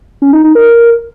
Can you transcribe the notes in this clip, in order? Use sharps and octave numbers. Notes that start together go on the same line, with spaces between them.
C#4
D#4
D#4
A#4